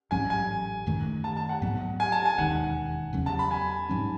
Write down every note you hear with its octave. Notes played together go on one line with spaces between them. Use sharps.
A1 G#2 F#3 C#4 G#5
G#5
F#2 D#3 A3
A5
A5
F#5
G#2 F#3 B3
G#5
A5
G#5
E1 D#2 D#3 F#5
E2 C#3 F#3 C#4
A5
B5
G#5
G#2 F#3 C#4